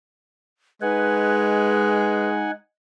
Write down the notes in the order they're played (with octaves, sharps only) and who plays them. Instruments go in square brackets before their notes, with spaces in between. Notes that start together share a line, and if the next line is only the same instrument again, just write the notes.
[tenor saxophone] G#3 [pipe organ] D#4 F#5 G#5 [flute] B4